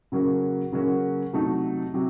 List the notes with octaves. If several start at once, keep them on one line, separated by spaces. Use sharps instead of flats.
C#3 F#3 A#3 C#4 F#4
C#3 F#3 A#3 C#4 F#4
C3 F#3 A3 D#4
C3 F#3